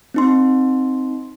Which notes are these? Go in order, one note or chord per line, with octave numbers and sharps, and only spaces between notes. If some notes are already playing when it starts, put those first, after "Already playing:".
C4 D#4 C6